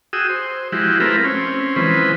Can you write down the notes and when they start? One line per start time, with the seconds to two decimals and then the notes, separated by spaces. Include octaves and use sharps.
0.13 F#4 G#4 G5 D#6 E6
0.29 C5
0.72 F3 G#3 E4 F#4 G4
1.00 A3 C4 E4 F4 A#4 B4
1.24 C4 C#4
1.76 E3 F3 G#3 B4 C5